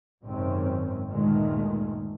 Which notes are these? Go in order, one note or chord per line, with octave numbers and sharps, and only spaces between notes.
G#1 F#2 C3 D#3 C4 C#4
D2 G2 A#2 D#3 G#3 A3